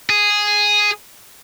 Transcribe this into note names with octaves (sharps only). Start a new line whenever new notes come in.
G#4